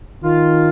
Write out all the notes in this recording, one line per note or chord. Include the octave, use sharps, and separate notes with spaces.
D#3 F4